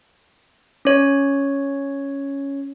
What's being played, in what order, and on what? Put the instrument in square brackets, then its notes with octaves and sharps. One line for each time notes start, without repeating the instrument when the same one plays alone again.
[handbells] C#4 C#5